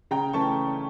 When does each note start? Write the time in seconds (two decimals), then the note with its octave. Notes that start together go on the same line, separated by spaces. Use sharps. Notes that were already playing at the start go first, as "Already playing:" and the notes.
0.11 C#3 G5 A#5
0.33 E3 A3 C#4 A5 C#6